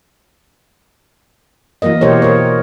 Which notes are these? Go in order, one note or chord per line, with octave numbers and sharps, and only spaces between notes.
E3 F#3 A#3 A#4 D#5
B2 G4 A#4 C5 C#5
A#4 C#5